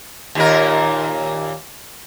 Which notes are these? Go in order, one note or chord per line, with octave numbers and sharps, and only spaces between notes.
D#2 A#2 A#4